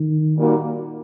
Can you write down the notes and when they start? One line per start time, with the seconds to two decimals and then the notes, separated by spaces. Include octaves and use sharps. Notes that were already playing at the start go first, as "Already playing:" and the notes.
Already playing: D#3
0.36 A#2 G3 A#3 D#4 F#4